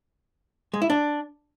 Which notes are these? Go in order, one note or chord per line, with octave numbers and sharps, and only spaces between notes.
G#3
E4
D4